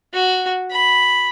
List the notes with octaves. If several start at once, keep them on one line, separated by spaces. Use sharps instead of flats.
F#4
B5